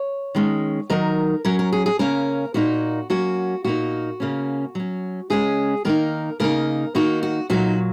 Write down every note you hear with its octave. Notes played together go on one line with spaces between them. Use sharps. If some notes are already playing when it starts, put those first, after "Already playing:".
Already playing: C#5
D#3 G#3 C#4
D#3 F#3 D#4 A#4
F#3 C#4 A#4
A#4
G#4
G#4
C#3 A#3 C#4 A#4
A#2 A#3 D#4 F#4
F#3 A#3 C#4 F#4
A#2 A#3 D#4 F#4
C#3 A#3 C#4
F#3 C#4
C#3 G#3 C#4 G#4
D#3 A#3 D#4 A#4
C#3 A#3 D#4 A#4
D#3 A#3 D#4 F#4
F#4
A#2 F#3 D#4 F#4